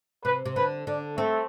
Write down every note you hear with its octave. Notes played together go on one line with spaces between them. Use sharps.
C3 B4
C3
D3 B4
D3 D4
A3 C4